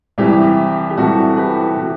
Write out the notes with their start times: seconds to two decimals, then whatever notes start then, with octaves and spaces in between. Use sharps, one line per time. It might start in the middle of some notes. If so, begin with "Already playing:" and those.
0.18 C2 C3 E3 E4 G4
0.90 G4
0.97 C2 C3 E3 F#4 A4
1.37 G4 B4
1.77 C3 E3